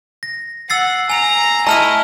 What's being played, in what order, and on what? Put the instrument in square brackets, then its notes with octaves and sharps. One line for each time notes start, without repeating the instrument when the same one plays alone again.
[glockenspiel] A#6
[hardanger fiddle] F#5 [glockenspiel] E6 A6 C7
[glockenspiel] G#5 F7 [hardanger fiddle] A#5
[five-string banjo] A3 [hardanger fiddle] E4 D#5 [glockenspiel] A#5 F6 D#7